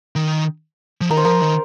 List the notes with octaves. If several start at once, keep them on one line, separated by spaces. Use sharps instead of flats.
D#3
F3
D#3 A#4
C5
F3 A#4
D#3